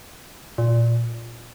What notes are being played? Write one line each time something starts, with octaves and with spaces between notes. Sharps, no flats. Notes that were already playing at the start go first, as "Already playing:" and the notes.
A#2